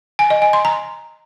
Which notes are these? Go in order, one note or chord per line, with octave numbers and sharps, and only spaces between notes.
G#5
D#5
G#5
C6
A#5